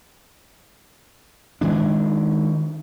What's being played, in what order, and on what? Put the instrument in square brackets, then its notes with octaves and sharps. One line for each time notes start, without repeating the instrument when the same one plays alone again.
[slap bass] D#3 G#3 D4